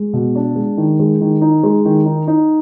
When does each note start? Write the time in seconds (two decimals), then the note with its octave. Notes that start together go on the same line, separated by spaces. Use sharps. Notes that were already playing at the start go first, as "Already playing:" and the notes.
Already playing: G#3
0.13 B2
0.35 D4
0.56 G#3
0.77 D#3
0.99 G#3
1.21 D#3
1.41 D#4
1.63 G#3
1.85 D#3
2.06 D#4
2.27 D#4